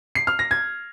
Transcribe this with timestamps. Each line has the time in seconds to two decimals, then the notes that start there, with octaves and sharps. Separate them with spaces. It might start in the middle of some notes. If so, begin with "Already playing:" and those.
0.15 C7
0.27 F6
0.39 A#6
0.51 G#6